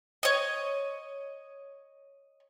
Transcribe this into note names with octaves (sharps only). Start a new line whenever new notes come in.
C#5 D#5